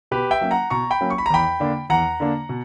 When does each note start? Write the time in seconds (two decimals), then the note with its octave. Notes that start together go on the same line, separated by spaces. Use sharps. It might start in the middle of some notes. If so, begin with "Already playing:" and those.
0.11 B2 G4 B4
0.31 E5 G5
0.41 F#3 A#3 C#4
0.51 F#5 A#5
0.70 B2 A#5 C#6
0.91 G5 B5
1.01 F#3 A#3 C#4
1.10 C#6
1.18 B5
1.26 A#5
1.30 E2 G5 B5
1.60 D3 A#3 D4
1.90 E2 F#5 A#5
2.20 D3 A#3 D4
2.49 B2